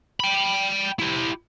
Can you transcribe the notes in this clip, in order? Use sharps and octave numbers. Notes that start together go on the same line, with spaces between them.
G5 B5
E4 G4